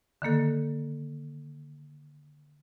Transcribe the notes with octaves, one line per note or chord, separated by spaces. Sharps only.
D3 D#3 A#3 A4